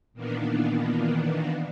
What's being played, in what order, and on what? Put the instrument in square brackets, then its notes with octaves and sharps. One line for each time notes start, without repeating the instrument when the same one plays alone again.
[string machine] A#2 D#3 E3 A#3 B3 D4